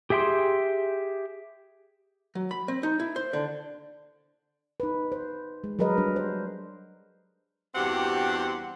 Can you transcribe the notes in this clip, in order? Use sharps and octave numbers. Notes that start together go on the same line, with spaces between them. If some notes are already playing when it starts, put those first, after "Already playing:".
G4 G#4 E5 G5 C6
F#3
B5
C4
D#4
E4
C5
D3
D#4 B4
C5
G#3
F#3 G#4 A#4 B4 D#5
G3 D4
C5
E2 G2 C4 F#4 G4 F#5